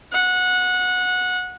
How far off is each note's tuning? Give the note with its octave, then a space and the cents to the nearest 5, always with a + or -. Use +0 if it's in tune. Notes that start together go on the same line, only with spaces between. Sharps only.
F#5 -20